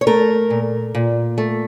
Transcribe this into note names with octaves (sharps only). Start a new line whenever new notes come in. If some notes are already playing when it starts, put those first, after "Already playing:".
C#5
A3 A#4
A#2
A#2
A3